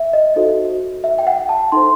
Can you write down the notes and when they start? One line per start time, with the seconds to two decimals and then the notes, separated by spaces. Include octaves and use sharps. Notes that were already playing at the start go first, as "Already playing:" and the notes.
Already playing: E5
0.13 D#5
0.36 D#4 F#4 A4 C5
1.04 E5
1.19 G5
1.27 F#5
1.49 A5
1.72 D#4 A4 C5 C6